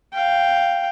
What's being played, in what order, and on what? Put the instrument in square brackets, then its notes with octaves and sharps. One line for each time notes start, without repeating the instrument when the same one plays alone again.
[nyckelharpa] F5 G5